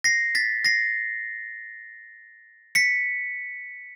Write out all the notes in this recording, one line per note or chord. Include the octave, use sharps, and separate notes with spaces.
A#6 C7
A6 B6
A#6 C7
B6 C#7